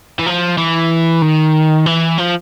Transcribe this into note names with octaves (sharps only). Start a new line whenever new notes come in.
E3
F3
E3
D#3
E3
F3